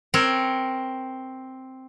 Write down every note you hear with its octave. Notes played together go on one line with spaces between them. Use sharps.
C4 A#4 C#5